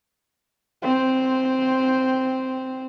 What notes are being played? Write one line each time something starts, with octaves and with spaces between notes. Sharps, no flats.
C4 C5